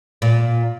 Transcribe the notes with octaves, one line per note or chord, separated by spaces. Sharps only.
A#2